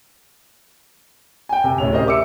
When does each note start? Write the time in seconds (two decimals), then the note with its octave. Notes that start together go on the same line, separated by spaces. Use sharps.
1.49 G5 G#5
1.64 C3
1.78 D1 C#4 F7
1.92 G4 A#4 C5 D#5
2.07 E5 D6 E6 C#7